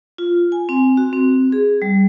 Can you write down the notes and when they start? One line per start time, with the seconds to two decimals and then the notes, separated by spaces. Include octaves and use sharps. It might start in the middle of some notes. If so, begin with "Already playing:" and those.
0.18 F4
0.52 G#5
0.69 C4
0.97 F#4
1.13 C4
1.52 G#4
1.82 G3